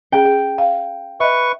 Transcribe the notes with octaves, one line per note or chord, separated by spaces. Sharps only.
C#4 G#4 G5
G#4
F5
B4 D#5 E5 C#6